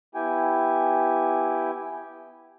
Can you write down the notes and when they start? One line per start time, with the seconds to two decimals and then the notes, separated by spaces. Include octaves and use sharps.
0.15 B3 E4 G4 G5 G#5